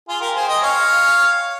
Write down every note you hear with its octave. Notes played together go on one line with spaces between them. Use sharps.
F4 G#4
G4 A#4
G#4 C5
D#5 G5
C#5 F5